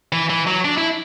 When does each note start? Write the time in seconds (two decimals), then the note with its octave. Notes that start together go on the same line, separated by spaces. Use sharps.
0.13 E3
0.30 E3
0.47 F#3
0.65 D4
0.78 E4